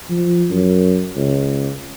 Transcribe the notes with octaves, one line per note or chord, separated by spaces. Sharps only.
F3
F#2
C#2